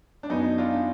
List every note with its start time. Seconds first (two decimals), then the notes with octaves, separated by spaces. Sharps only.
0.23 D4
0.30 F#2 B3 D#4
0.58 D4 F4